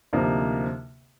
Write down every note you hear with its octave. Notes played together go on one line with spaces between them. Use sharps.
D2 C3 F3 A#3 D#4